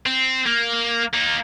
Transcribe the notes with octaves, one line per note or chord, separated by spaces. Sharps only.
C4
A#3
A#3 D#4